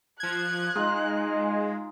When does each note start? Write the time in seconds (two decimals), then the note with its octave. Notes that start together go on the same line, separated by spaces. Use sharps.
0.20 F3 F#6 G#6
0.75 G#3 D#4 F4